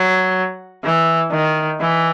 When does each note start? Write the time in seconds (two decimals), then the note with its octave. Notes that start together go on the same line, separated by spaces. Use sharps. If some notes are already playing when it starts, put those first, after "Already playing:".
Already playing: F#3
0.84 E3
1.31 D#3
1.80 E3